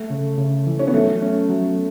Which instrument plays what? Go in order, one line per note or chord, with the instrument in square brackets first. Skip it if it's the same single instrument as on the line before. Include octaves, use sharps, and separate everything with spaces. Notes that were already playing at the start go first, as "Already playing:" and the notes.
Already playing: [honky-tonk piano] A3
[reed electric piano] C#3
C#3
E3
[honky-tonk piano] C#4
B3
[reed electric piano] F#3 [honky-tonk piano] A3
[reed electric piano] C#4
F#3